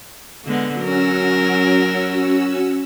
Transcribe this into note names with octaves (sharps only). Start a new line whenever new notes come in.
D3 G#3 B3
F#3 C#4 F#4 A#4 E6